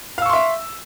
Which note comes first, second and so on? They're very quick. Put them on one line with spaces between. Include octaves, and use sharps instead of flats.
F5 E6 C#6 C6 E5